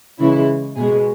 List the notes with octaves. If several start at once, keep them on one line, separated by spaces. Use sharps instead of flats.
C#3 E3 G#3 E4
B2 G#3 G#4